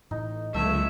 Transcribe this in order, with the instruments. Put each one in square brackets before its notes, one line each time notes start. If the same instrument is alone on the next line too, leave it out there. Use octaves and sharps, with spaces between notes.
[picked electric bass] A1 A2 [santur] D#4
[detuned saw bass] C#2 [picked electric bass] D3 F#3 A#3 [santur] A3 A4 C#5 [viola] E5